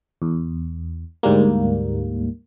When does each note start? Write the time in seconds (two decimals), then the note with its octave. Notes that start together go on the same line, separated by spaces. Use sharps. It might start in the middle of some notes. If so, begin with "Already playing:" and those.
0.22 E2
1.23 D2 G#2 G3 A#3